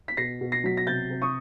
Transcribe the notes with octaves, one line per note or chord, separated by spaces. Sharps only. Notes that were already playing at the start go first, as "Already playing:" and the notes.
B6
B2 A#6 C7
B2
A#6 C7
F#3 B6
A#6
C3 G6 A6
C3
C#6 D#6